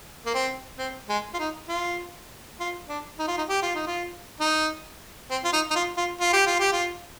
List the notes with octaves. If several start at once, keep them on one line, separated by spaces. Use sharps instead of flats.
A#3
C4
C4
G#3
F4
D#4
F4
F4
D4
D#4
F4
D#4
G4
F4
D#4
F4
D#4
C4
F4
D#4
D#4
F4
F4
F4
G4
F4
G4
F4